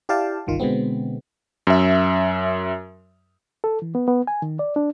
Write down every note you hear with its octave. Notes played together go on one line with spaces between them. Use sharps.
E4 G4 D5 F5 G5 A5
G1 C2 D#3 F4
B2 D3 G#3 B3 C4
F#2 E5
A4
E3
B3
B3
G#5
D#3
D5
D4